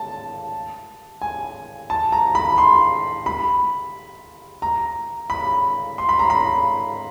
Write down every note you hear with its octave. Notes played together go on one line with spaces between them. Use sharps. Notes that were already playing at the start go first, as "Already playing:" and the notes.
Already playing: A5
G#5
A5
A#5
B5
C6
B5
A#5
B5
C6
B5
A#5
B5